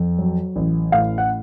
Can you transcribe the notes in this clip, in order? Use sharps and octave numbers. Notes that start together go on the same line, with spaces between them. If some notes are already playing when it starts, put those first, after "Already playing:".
Already playing: F2
F#3
A1
A2 F5
F#5